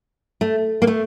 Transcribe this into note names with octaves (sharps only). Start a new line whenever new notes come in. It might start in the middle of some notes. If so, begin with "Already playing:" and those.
A3
A#3
A3